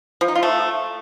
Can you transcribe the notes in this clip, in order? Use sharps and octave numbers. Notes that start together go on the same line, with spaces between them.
F3
D#4
F4
A3